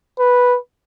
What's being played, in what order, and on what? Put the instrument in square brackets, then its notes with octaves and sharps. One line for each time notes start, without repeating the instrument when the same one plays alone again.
[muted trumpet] B4